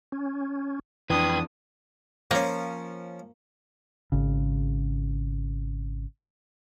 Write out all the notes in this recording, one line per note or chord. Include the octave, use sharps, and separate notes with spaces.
C#4
F2 E3 D4 B4 G5 B5 D#6 G#6
F3 A#3 C#4
G#1 C#3